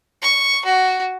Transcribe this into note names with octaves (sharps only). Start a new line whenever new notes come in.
C#6
F#4